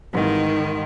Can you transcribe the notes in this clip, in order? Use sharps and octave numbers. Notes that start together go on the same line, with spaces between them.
G#1 G#2 D#3 E3 G3